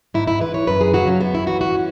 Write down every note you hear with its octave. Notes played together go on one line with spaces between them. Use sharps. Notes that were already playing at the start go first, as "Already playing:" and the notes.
G#2 E4
E4
E3 B4
C#5
F#2 B4
G#4
C#3 F#3 F#4
C#4
F#2 B3
E4
E3 F#4
F#4
C#4